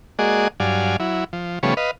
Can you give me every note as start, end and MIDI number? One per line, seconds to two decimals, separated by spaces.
0.19 0.48 56
0.19 0.48 58
0.19 0.48 66
0.19 0.48 68
0.19 0.48 74
0.19 0.48 75
0.60 0.97 43
0.60 0.97 54
0.60 0.97 74
0.60 0.97 77
0.60 0.97 80
1.00 1.24 54
1.00 1.24 64
1.33 1.59 53
1.63 1.74 49
1.63 1.74 53
1.63 1.74 55
1.63 1.74 57
1.63 1.74 59
1.63 1.74 73
1.77 1.91 71
1.77 1.91 75
1.77 1.91 77